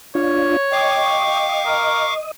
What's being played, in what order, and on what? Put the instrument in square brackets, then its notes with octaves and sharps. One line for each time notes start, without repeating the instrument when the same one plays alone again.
[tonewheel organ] D4 F4 [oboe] C#5
[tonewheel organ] D#5 [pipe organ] F5 C#6 D6 [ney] G5
[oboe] A#4